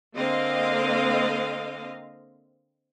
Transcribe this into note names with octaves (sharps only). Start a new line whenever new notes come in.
D3 A#3 C4 D#5 F5